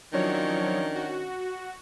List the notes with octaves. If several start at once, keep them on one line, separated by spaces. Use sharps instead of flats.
D#3 F3 F#3 C#4 D4 C#5
F#4